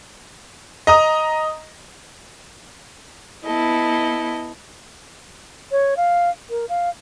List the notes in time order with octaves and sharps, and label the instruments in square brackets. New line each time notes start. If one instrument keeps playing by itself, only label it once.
[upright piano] D#5 A#5 D#6
[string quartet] B3 E4 A4 D#5
[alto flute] C#5
F5
A#4
F5